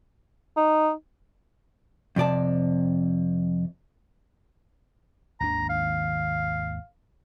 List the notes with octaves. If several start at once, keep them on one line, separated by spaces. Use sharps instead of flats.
D#4
F2 C3 D5 A5
G#1 D#2 D4 A#5
F5